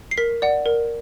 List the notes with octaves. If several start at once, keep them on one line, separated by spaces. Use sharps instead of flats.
C7
A#4 B6
D5 F#5
A#4